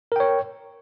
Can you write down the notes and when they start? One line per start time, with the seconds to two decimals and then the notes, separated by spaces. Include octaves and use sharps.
0.12 A#4
0.16 G5
0.20 C#5